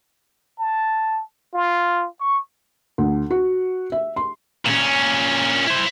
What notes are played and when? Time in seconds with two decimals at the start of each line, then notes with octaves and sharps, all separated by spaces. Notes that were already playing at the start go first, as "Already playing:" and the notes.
0.59 A5
1.54 F4
2.20 C#6
2.98 D2
3.30 F#4
3.92 E5
4.16 C6
4.66 A#2 C#4
5.67 E4 C5